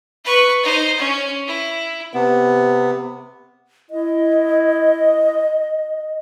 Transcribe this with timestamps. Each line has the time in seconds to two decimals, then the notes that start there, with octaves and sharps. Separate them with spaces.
0.25 B4 C#6
0.63 D#4 C5
0.98 C#4
1.47 E4
2.13 C3 B3
3.91 E4 D#5